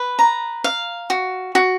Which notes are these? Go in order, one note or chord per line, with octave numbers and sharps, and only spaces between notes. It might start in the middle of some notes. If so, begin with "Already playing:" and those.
Already playing: B4
A#5
F5
F#4
F#4